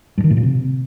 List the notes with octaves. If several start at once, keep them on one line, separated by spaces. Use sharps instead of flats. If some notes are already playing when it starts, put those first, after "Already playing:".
G2
D#3
A2
A#2
C3